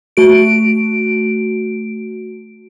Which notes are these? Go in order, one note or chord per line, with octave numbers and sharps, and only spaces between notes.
A3 F#4 D7